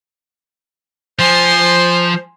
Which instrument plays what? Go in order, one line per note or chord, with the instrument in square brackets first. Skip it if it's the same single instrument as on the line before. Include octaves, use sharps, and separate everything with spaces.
[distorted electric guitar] F3 [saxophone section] C5 [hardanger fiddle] G#5 C6